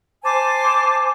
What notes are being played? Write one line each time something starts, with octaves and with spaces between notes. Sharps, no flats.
C5 G#5 A5 D6